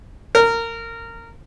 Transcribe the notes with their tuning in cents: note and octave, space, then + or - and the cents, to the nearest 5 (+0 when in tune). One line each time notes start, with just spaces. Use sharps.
A#4 -20